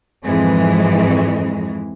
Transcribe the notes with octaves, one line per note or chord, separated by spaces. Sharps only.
F2 G#2 E3 G#3